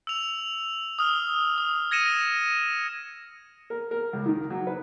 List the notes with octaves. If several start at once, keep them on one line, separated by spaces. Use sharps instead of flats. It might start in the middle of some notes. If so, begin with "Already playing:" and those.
E6 F7
D#6 F6
D#6
G#6 A#6 C#7 D#7 E7
A#4
A#4
C#2
D#3
F#3
B4